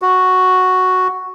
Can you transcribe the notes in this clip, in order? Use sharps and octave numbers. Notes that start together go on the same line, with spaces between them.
F#4